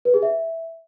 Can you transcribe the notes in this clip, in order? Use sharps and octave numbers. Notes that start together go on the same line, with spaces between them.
B4
G#4
E5